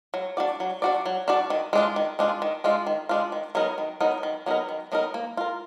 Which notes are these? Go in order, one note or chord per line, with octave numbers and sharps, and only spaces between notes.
F#3
D4 F#4 D5
F#3
D4 F#4 D5
F#3
D4 F#4 D5
D#3
G#3 D4 F4
D#3
G#3 D4 F4
D#3
G#3 D4 F4
D#3
G#3 D4 F4
D#3
F#3 B3 D#4 A#4
D#3
F#3 B3 D#4 A#4
D#3
F#3 B3 D#4 A#4
D#3
F#3 B3 D#4 A#4
A#3
F4 A#4